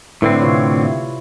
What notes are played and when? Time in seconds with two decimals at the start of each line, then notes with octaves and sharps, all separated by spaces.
0.22 A2 D3 C4 E4 B4 D5
0.42 C3 F4 C#5
0.81 E4